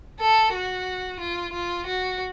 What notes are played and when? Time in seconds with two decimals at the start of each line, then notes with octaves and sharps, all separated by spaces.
0.21 A4
0.54 F#4
1.20 F4
1.54 F4
1.86 F#4